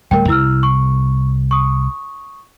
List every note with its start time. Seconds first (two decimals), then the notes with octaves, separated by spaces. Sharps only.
0.11 D1 G3 A3 A#4 G5
0.28 C2 E4 E6 F6
0.63 C#6
1.51 C#6 D#6